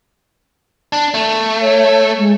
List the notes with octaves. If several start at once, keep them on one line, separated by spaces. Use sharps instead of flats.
D4
A3
C#5
G#3